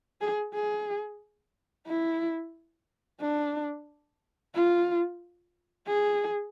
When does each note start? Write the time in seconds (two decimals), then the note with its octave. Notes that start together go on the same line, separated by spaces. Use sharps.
0.21 G#4
0.55 G#4
1.87 E4
3.20 D4
4.55 F4
5.87 G#4